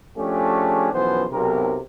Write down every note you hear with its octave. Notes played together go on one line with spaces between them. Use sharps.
F3 A3 C#4 D4 G4 G#4
B1 F#2 E3 F3 B3 C5
B1 C3 A#4